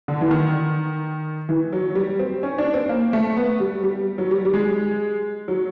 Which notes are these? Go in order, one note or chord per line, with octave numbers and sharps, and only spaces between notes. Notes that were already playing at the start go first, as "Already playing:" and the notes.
D3
E3
D#3
E3
F#3
G3
C4
C#4
D4
C4
A#3
A3
B3
G3
G3
F#3
G3
G3
G#3
F#3